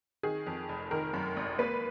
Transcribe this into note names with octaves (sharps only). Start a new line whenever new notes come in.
D#3 G#4
F2
F1
D#3 A#4
F#2
G#1
A#3 B4